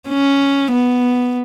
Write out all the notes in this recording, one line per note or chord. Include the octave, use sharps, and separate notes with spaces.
C#4
B3